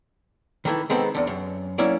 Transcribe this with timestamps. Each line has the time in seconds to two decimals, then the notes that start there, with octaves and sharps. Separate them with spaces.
0.65 D#3 E3 A3 E4
0.90 D#3 G#3 B3 C4 A4
1.15 E2 D3
1.27 F#2
1.78 F#3 A#3 C#4 E4 D5